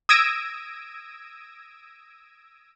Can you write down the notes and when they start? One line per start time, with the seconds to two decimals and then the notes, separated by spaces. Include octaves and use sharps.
0.09 D#6 E6 G#6 A#6 D7 D#7